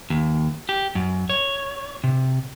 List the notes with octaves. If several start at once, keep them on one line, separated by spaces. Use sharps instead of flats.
D#2
G4
F#2
C#5
C3